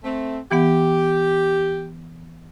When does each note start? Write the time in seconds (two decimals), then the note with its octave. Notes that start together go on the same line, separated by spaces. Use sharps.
0.04 A3 C4
0.52 E3 B3 G4 F#5